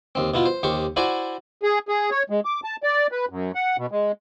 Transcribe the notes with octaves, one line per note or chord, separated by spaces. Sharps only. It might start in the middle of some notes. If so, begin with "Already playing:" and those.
D#2 C4
B2 E4 F4
C5
D#2 G4 C5 C#6
E4 F#4 C5 D5 G#5
G#4
G#4
C#5
G#3
D6
A5
D5
B4
F#2
F#5
B2
G#3